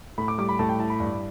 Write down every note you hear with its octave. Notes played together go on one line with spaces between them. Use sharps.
A2 B5
D6
G3 D6
B5
A2 A5
G5
E4 A5
B5
G2